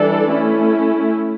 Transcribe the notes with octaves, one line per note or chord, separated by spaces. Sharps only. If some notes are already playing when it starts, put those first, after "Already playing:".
Already playing: E3 G3 D4 A4 D5
A3 C#4 E4